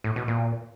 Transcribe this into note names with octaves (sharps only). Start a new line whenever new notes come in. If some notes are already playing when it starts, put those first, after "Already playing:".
A2
B2
A#2